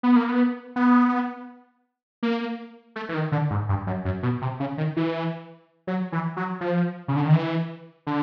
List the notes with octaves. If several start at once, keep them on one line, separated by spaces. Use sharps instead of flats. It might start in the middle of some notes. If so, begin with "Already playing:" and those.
B3
A#3
B3
B3
A#3
A3
E3
D#3
D3
G#2
G2
F#2
F#2
B2
C3
C#3
D#3
E3
F#3
E3
F#3
F3
C#3
D3
D#3
E3
D3